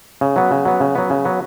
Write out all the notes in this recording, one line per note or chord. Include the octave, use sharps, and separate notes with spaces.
C#3
F#3 B3
C#3
F#3 B3
C#3
F#3 B3
C#3
F#3 B3